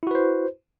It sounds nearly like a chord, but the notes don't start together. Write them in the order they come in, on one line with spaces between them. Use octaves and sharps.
E4 F#4 B4 C5